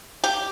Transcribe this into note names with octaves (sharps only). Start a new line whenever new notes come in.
G4